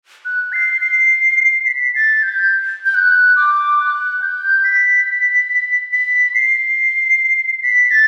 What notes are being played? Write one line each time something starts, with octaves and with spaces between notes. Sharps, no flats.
F#6
C7
C7
B6
A6
G6
G6
F#6
D6
F#6
G6
B6
B6
C7
B6
A6